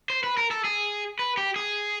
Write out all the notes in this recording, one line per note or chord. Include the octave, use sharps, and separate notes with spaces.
C5
B4
A#4
A4
G#4
B4
G4
G#4